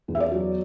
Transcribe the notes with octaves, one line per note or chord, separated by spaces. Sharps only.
E2
E5
D5
F#3